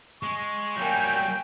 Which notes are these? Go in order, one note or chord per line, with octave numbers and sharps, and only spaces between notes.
G#3 C#6
F#3 G3 A#3 G5 G#5